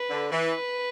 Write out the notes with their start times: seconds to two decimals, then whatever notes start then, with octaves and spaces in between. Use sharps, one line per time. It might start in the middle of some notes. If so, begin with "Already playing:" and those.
Already playing: B4
0.10 D3
0.32 E3 B4